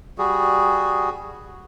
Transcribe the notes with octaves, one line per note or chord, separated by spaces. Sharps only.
G3 F#4 G#4